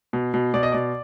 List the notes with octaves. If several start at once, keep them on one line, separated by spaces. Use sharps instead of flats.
B2
B2
B2 D5
D#5
B2 D5